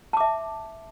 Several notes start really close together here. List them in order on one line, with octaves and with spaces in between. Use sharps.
A5 D6 E5